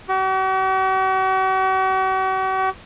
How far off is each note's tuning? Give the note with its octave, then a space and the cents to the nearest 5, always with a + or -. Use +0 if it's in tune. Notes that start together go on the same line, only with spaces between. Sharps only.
F#4 +45